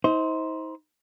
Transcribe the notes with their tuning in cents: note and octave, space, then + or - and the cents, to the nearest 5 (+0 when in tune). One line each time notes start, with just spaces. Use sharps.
D#4 +40 C5 +0